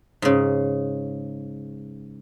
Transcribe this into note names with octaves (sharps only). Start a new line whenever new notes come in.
G#2 C#3